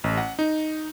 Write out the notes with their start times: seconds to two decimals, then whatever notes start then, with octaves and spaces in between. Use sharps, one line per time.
0.04 A1
0.17 F#5
0.39 D#4